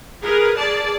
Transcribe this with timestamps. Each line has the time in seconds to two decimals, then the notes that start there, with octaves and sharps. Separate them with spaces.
0.22 G#4 A#4 B4
0.56 G#4 D5 A5